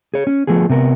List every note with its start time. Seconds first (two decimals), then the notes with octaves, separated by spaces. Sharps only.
0.14 G#4 C#5
0.27 C#4
0.47 F3 A3 B3 G#4
0.69 C3 B3 A#4